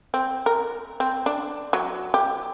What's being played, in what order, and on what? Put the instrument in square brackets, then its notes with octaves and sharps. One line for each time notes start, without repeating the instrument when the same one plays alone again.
[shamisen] C4
A#4
C4
D4
F#3
G4